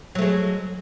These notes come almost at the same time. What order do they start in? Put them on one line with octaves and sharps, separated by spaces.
F#3 A3 G#3